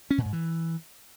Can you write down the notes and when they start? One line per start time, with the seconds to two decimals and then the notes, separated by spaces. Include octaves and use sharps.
0.10 C#4
0.18 A#2
0.25 G#2
0.33 E3